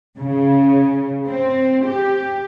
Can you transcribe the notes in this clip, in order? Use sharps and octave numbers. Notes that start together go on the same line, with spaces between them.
C#3
C4
G4